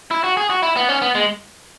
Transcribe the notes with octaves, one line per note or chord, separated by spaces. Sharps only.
E4
F#4
G#4
F#4
E4
B3
C#4
B3
G#3